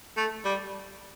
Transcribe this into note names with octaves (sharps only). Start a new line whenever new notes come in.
A3
G3